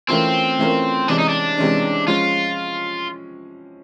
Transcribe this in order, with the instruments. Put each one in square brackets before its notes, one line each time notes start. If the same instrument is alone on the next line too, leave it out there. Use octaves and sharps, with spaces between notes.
[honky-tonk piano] E3 A3 C#4 F4 A#4 [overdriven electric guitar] C4
[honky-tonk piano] E3 A3 C#4 F4 A#4
[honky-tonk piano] C3 E3 G#3 C#4 [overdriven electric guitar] D4
[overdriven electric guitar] D#4
D4
[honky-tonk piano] C3 E3 G#3 C#4
[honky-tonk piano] F3 G#3 C#4 [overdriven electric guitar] F4